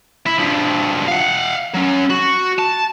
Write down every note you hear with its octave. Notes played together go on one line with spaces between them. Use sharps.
E4
G2 F3
F5 F#5
F#3 C#4
F#4
A5